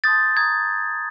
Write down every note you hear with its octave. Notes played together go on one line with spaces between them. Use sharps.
A5 C6 D#6 G6 A6
A#5 D#6 G6 G#6